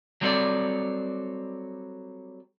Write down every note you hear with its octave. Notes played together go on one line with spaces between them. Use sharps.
F#3 G3 C4 D4 A4 D5